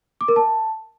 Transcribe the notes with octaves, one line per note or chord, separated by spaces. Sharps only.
D6
A#4
A5